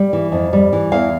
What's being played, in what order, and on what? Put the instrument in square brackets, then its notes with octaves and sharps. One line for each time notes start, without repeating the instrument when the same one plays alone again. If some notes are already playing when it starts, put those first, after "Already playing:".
Already playing: [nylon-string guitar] G3
E3
F2
G3
E3
E2 F5